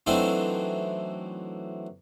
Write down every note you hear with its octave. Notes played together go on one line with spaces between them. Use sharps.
E3 F#3 A3 C4 D4 D#4